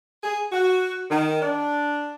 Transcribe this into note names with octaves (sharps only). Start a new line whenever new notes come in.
G#4
F#4
D#3
D4